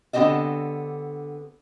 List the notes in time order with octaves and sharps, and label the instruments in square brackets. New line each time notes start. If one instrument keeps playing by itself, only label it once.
[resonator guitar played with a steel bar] D3 B3 C4 G4 D#5 E5